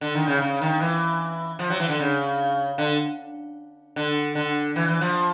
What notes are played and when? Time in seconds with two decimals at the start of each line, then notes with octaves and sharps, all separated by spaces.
0.01 D3
0.15 D#3
0.28 C#3
0.42 C#3
0.61 D#3
0.81 E3
1.59 F3
1.70 F#3
1.80 E3
1.89 D3
1.99 C#3
2.78 D3
3.96 D3
4.35 D3
4.76 E3
4.88 E3
5.01 F3